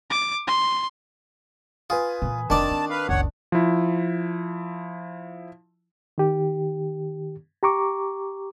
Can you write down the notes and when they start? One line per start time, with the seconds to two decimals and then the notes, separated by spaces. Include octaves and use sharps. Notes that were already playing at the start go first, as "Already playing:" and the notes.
0.11 D6
0.47 C6
1.90 F4 B4 G#5 D#6
2.22 A#2 E3
2.50 F1 F2 D#3 D4 D5 A5
2.71 C4
2.90 B4 F5
3.09 F#1 C#2 C#5 F#5
3.52 F3 E4
6.18 D#3 G4
7.63 G4 A#5 C#6 D6